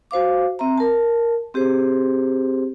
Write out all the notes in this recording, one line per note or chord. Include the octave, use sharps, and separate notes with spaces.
F#4 C5 F5 D6
C4 E5 A#5
A#4 A5
C4 G4 G#4 C5